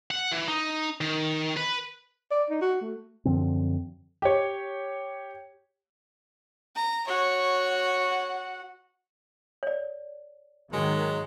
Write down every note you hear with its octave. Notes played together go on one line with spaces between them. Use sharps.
F#5
E3
D#4
D#3
B4
D5
D#4
F#4
A3
F#2 D3 F3 C4
G4 C#5
A#5
F#4 C#5 F#5
C#5 D5
G#2 D#3 F#3 G#3